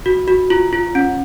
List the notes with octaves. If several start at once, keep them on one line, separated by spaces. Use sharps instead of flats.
F#4
F#4
F4
F4
C#4